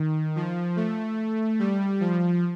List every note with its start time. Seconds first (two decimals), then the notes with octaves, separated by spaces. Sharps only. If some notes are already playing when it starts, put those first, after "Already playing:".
Already playing: D#3
0.36 F3
0.76 A3
1.59 G3
2.00 F3